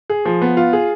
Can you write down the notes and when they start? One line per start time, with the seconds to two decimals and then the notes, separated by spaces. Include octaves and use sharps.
0.10 G#4
0.25 F3
0.42 B3
0.57 F4
0.73 G#4